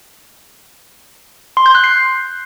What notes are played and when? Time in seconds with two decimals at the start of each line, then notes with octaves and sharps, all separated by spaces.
1.57 C6
1.66 G6
1.75 F#6
1.84 C7